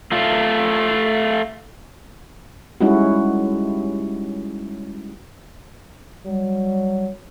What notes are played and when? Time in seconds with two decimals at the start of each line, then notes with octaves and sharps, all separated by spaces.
0.12 A3 F4
2.81 G3 G#3 C#4 D#4 E4 F#4
6.26 F#3 G3